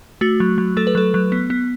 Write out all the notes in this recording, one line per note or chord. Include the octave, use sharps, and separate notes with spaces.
A3 F#4
F#3
F#3
A3 A4
B4
F#3 A4
F#3
B3
B3